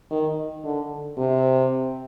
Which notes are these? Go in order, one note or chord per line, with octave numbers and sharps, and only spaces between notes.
D#3
D3
C3